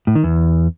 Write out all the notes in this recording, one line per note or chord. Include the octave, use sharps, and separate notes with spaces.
A2
D#3
E2